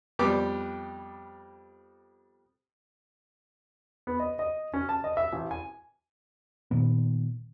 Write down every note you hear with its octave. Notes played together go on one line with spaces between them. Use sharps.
F2 G3 B3 G4 D6
B3
D#5
D#5
C#4
A5
D#5
E5
A1
G#5
A#2 D#3 B3